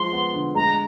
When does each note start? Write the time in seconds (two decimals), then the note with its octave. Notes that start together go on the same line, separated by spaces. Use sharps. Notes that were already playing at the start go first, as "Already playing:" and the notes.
Already playing: F3 G#3 C6
0.13 B3
0.34 D3
0.55 G#3 A#5